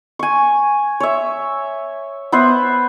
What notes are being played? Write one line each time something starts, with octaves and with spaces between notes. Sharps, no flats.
G#5 C#6
C#5 E5
B3 B4 C5 E5